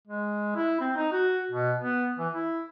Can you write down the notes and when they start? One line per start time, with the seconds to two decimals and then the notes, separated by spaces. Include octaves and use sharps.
0.07 G#3
0.56 E4
0.81 C4
0.96 D#4
1.12 F#4
1.52 B2
1.78 B3
2.19 E3
2.33 E4